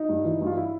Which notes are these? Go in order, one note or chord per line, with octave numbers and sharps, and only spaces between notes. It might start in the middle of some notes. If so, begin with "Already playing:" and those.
Already playing: D#4
G2
E3
G2 F4
E4